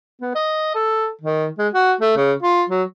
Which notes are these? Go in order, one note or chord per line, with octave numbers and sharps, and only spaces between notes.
B3
D#5
A4
D#3
G#3
F#4
A3
C#3
F4
F#3